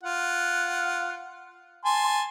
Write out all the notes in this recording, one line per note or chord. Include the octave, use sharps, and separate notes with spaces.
F4 F#5
G#5 A5 C6